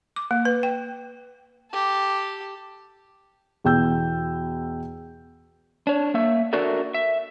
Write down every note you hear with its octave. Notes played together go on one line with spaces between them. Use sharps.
D6
A#3
B4
G5
G4 A4
E2 B2 G5 E6 G6
D4 C#5
A#3 E5
D4 F#4 A4 A#4 D5 E5
E5